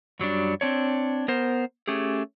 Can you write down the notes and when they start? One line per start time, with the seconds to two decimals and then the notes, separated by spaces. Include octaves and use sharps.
0.19 F#2 F#3 G3 D4
0.61 C4 D4 C#5
1.28 B3 A#4 C5
1.88 A3 C#4 G4 G#4